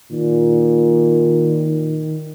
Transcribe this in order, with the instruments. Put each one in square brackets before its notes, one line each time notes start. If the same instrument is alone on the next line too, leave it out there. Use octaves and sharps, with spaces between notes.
[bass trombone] A#2 [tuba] D#3